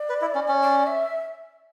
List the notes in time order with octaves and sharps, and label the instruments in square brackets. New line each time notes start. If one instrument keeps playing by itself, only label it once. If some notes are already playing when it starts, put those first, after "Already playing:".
Already playing: [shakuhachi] D5
[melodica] B4
E4
C#4
C#4
[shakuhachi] D5
E5